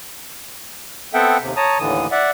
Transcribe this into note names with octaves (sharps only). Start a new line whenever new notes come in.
B3 C4 A4 E5 F#5 G5
D#2 C3
C#5 A5 A#5 D#6
D#2 A2 D3 E3 D#6
D5 E5 F#5